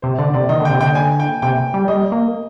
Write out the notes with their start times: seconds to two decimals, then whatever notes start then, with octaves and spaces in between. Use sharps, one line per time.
0.02 C3 C5
0.19 D3 D5
0.34 C3 D5
0.49 D#3 D#5
0.60 D3
0.65 C3 G5
0.80 D3 G5
0.95 G#5
1.20 G5
1.42 C3 G5
1.74 G3
1.88 G3 D#5
2.12 A#3